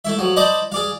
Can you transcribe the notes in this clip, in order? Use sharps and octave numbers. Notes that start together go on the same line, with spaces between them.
A3 E4 E5
F3 F#3
D#4 C5 D5 D#5 A5 B5
G#4 D5 F5